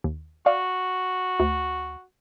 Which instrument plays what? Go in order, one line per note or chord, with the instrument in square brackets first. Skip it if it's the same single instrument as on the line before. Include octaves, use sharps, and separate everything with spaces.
[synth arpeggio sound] D#2
[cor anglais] F#4 [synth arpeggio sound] D5 F5
[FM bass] D2